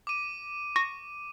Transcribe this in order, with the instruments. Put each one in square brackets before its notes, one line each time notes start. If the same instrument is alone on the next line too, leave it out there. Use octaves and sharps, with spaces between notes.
[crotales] D6 D#7
[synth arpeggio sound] C#6 A#6